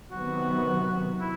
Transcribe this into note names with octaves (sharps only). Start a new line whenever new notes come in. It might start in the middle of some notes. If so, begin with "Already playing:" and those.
C3 D#3 F#3 B3 F#4
E4